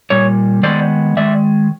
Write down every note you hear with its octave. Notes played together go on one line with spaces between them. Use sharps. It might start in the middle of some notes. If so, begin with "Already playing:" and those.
A#2 G3 C#5
D#3 G#3 B3 C5 D5
D#3 G#3 D5 E5